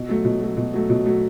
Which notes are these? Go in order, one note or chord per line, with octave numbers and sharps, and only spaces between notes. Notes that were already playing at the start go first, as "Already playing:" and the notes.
Already playing: B2
F#3 A3
B2
F#3 A3
B2
F#3 A3
B2
F#3 A3